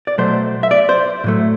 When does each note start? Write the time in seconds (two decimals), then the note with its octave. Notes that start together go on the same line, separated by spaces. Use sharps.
0.07 D5
0.18 B2 F#3 A3 C5
0.63 E5
0.71 D5
0.89 C5
1.24 A2 F#3 A3